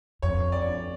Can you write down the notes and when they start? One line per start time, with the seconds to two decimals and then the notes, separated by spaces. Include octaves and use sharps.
0.22 F2 C#5
0.52 D5